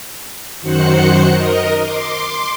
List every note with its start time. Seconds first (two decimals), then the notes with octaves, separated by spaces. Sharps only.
0.62 F#2 D#3 F#4 C5 F#6 C#7
1.25 A#4 D#5
1.80 C6 D6